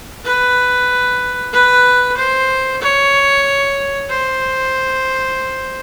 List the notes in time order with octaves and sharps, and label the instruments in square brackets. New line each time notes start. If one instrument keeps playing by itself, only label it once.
[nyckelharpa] B4
B4
C5
C#5
C5